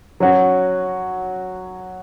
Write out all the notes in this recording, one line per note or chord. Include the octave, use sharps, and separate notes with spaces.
F#3 C#4 F#4